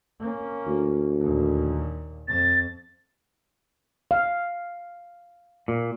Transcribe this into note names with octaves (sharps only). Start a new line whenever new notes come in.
A#3 C#4
D2
D#2 A#2
F2 A6
F5
A#2